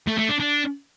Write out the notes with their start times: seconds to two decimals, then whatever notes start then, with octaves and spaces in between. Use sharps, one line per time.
0.07 A3
0.18 A3
0.29 D4
0.40 D4